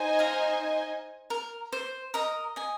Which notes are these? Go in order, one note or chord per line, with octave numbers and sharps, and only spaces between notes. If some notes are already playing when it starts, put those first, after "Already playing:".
Already playing: D#4 C5 D#5 G#5
F5 A#5
A#4
C5
A#4 D#5
D#5 G#5